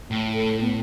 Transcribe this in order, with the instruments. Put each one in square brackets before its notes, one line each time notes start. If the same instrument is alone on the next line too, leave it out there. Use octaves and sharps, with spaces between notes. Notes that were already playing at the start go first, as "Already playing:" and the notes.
[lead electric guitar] A2
[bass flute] A4
B3